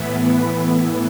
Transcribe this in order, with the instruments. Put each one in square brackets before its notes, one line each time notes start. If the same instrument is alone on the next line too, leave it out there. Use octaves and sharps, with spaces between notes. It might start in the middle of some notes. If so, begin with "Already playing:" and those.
Already playing: [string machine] A2 E3 B3 E4